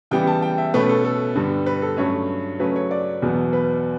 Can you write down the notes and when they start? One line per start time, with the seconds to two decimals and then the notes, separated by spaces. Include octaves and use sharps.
0.11 C#3 E3 G3 B3 G5
0.27 A5
0.42 G5
0.58 E5
0.74 B2 A3 C#4 B4
0.89 A4
1.05 A4
1.35 G2 D3 G3 B3
1.66 B4
1.82 A4
1.97 G2 F#3 A3 C#4 C#5
2.59 C#3 F#3 A3 C#4 B4
2.76 C#5
2.91 D5
3.22 E2 B2 F#3 B3
3.53 B4